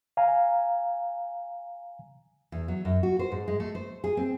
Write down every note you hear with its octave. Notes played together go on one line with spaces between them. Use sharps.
F5 G#5 A#5
E2
F#3
F#2
F#4
C5
G#2
G#3
A3
C5
G#4
C4